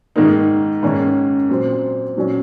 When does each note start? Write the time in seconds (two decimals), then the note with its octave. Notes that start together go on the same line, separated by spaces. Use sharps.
0.16 G#2 D#3 A#3 D#4
0.83 G#2 D#3 A#3 C#4
1.49 A#2 F#3 C4
2.16 A#2 F#3 C#4